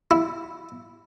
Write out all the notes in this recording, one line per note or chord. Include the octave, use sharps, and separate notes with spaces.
E4